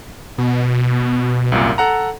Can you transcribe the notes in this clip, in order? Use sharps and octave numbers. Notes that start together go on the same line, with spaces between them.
B2
C2 F#2 A#2
A4 F#5 A#5